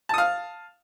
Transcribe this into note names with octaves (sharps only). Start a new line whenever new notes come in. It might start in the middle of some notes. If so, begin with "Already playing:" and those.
F5 A5 D#6